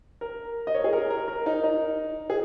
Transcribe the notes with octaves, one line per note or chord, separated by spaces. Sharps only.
A#4
D#5
C#5
G#4
A#4
A#4
A#4
D#4
D#4
G#4